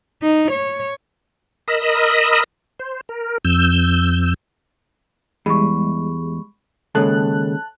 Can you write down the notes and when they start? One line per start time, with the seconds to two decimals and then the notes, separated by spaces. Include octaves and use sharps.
0.22 D#4
0.52 C#5
1.68 A#4 D#5 B5 D#6 E6
2.79 C5
3.09 A#4
3.45 F2 E6 G6
5.46 E2 G3 G#3 B5 C#6
6.95 D#2 C#3 G#3 A4 C#5 A5 F#6